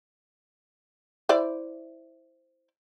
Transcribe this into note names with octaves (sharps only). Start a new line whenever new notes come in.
E4 C5 D5